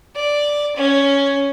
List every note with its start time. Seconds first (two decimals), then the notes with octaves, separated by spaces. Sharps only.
0.15 D5
0.76 C#4